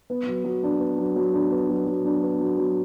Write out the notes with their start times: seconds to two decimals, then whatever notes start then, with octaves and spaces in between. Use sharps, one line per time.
0.10 B3
0.27 F#3
0.44 F#3
0.63 D4
0.80 B3
0.98 F#3
1.16 F#3
1.33 D4
1.51 B3
1.69 F#3
1.86 F#3
2.05 D4
2.23 B3
2.41 F#3
2.58 F#3